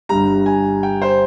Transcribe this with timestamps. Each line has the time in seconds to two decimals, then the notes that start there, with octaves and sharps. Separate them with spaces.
0.09 G1 G2 G3 A#5
0.46 G#5
0.83 G5
1.02 C5